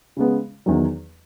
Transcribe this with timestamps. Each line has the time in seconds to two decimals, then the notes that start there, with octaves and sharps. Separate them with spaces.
0.17 C#3 G#3 B3
0.66 E2 D#3 F#3